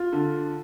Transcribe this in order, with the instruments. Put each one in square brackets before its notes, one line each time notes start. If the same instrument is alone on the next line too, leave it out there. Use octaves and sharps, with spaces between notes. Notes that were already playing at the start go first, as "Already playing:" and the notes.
Already playing: [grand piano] F4
D3